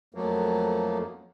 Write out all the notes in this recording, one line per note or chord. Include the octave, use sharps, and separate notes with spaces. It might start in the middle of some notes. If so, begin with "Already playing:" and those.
F2 F3 F#3 A3 A#3